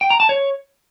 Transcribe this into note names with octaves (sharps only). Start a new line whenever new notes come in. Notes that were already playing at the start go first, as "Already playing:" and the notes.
G5
A#5
A5
C#5